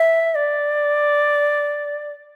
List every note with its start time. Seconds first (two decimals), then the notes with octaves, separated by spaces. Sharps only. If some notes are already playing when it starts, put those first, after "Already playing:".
Already playing: E5
0.35 D5